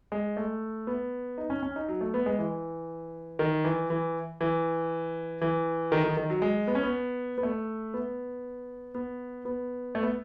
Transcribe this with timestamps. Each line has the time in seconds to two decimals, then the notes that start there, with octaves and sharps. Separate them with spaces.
0.12 G#3
0.37 A3
0.87 B3
1.38 D#4
1.50 C#4
1.63 C#4
1.76 D#4
1.88 F#3
2.01 A3
2.14 B3
2.26 G#3
2.39 E3
3.39 D#3
3.64 E3
3.90 E3
4.41 E3
5.42 E3
5.92 D#3
6.04 D#3
6.17 D#3
6.30 F#3
6.42 G#3
6.67 B3
6.75 C#4
6.83 B3
7.38 B3
7.43 A3
7.94 B3
8.95 B3
9.45 B3
9.95 A3
10.03 B3